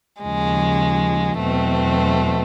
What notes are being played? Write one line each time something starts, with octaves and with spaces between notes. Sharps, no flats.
D#2 C#3 F3 G#3
E2 B2 F#3 A3 C4